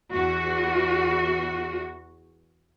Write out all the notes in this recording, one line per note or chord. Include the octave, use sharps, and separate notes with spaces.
E2 F#4